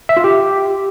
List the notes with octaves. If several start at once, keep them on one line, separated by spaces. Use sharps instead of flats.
E5
F4
G4